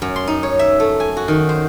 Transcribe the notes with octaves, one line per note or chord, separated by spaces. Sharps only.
F#2
C6
D#4
C#5
E5
A3
G#5
F#4
D#3
C5